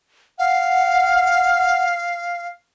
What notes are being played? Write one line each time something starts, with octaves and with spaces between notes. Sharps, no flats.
F5 F#5